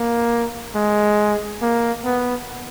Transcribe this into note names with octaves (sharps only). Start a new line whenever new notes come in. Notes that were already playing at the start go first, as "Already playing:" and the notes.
Already playing: A#3
G#3
A#3
B3